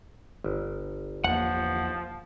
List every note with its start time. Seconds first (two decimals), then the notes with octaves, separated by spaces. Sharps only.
0.44 G1
1.24 E2 F3 A#3 F#5